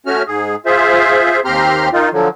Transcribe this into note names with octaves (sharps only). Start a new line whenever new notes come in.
A3 C#4 F#4 F6
G#2 G#4
F4 G#4 C5 E5
D#2 C4 G4 A#5 C6 F6
D#3 D#4 F4
D3 F3 F#3